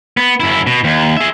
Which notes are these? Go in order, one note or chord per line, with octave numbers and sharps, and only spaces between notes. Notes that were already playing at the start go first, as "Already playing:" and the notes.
B3
F#2 E4
B2
D#2
G#4 E5